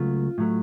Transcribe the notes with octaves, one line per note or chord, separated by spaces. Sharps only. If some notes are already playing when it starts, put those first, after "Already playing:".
Already playing: C#2 C#3 F#3 A3 F4
A2 F#3 A3